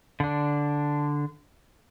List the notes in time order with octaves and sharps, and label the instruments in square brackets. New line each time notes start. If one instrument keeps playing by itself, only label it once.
[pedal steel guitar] D3 D4